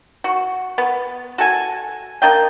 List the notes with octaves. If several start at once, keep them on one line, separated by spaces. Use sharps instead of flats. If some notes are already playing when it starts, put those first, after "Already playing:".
F#4
B3
F#4 A4 G#5
A#3 D4 D#5 G5